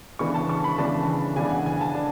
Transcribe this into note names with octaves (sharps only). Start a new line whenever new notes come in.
C#3 E3 B3 D4 C#6
A5
C#6
B5
C#3 E3 B3 D4 A5
C#3 E3 B3 D4 G#5
F#5
G#5
A5
D4